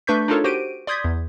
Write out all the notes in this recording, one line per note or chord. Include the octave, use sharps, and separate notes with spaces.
A3 D4 B4 C#6 G6 B6
D4 D#4 F4 A4 A#4 C#5
F#4 G4 C5 D7 D#7
D5 C6 D#6 G6 G#6 B6
E2